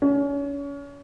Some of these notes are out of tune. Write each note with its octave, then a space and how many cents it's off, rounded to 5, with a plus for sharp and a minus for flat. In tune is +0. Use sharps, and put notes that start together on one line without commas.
C#4 +30